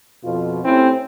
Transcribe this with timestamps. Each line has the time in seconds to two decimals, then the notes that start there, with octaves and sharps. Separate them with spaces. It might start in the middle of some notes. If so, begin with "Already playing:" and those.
0.24 F2 B2 F4
0.65 A2 C4 C#4 E4 G4